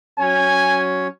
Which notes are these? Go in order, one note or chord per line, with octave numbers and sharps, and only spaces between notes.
F#3 C#4 C#5 G#5